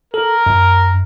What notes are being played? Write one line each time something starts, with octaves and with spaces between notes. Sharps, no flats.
A4 A#4
F#2